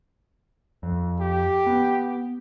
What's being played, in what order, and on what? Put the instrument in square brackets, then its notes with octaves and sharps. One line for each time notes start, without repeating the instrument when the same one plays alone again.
[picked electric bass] F2
[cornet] G4
[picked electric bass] B3